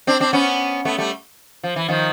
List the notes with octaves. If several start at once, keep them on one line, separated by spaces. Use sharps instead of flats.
C4 D4
C4 D4
B3 C#4
A3 B3
G3 A3
F3
E3
D#3 F3